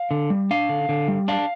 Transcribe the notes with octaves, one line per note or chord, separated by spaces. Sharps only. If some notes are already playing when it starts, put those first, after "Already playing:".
Already playing: F5
D3
G3
D4 F5
D3
D3
G3
D4 F5